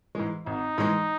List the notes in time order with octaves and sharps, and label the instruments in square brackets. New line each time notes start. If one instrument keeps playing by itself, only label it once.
[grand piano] G#2 E3 G#3
[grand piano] G#1 [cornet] D#4
[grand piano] G#2 E3 G#3